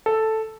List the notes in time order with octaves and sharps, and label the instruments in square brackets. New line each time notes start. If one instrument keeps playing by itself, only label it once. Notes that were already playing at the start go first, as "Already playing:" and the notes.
[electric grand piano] A4